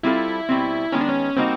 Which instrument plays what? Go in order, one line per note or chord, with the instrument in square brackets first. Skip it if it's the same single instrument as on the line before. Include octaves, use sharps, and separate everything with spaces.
[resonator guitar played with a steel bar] G3 C4 F4 A4 [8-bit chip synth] E4
[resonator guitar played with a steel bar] B2 G3 C4
[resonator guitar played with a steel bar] D#3 G#3 B3 [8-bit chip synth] C#4
[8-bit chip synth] D4
C#4
[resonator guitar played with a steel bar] G3 A#3 D#4 F#4 [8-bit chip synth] C4